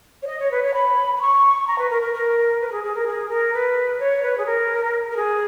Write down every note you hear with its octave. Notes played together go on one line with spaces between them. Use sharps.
C#5
D#5
C#5
B4
C#5
B5
B5
C#6
A#5
B4
A#4
A#4
A#4
B4
A#4
G#4
G#4
A#4
G#4
A#4
B4
C#5
B4
G#4
A#4
A#4
G#4